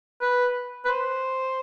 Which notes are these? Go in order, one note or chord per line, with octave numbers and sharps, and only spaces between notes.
B4
B4
C5